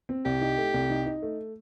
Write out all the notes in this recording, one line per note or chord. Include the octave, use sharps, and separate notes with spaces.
C4
C2 G4
D#4
A3
C2
D#4
D#4
A3